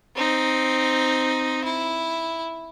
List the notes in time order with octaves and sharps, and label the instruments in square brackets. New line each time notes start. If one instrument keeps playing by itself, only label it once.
[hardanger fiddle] C4 D#4
E4